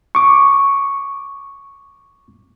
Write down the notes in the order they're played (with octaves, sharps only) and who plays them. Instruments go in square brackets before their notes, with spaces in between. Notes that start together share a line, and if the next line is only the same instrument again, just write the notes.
[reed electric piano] C#6 D6